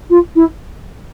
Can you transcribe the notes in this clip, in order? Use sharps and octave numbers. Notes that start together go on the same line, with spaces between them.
F4
E4